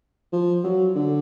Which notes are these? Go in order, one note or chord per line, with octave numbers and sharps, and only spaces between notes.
F3
F#3
D3